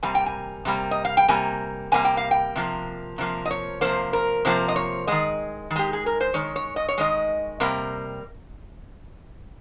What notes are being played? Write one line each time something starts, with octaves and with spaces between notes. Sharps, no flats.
C3 G3 A#3 G#5
G5
G#5
C3 G3 A#3
D#5
F5
G5
C3 G3 A#3 G#5
C3 G3 A#3 G#5
G5
F5
G5
C3 F3 A#3
C3 F3 A#3
D#5
C#5
C3 F3 A#3 C5
A#4
C3 F3 A#3 C5
D#5
C#5
D#3 G#3 D#5
D#3
G#3 G4
G#4
A#4
C5
D#3 G#3 C#5
C#5
D#5
C#5
D#3 G#3 D#5
C3 G3 A#3